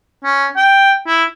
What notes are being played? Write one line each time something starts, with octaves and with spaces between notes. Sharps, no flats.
C#4
G5
E4